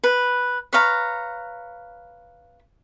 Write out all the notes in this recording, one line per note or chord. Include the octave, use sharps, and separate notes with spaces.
B4
B4 C#5 F5 A#5